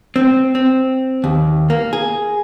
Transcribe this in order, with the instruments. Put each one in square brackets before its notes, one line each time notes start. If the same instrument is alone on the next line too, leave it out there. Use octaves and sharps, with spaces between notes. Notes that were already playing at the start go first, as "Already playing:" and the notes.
[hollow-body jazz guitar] C4
C4
D#2
A#3
G#4